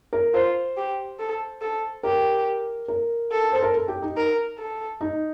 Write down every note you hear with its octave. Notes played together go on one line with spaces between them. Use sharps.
A#4
F4 C5
G4
A4
A4
G4 A#4
A#4
A4
C5
A#4
A4
G4
D#4
A#4
A4
D#4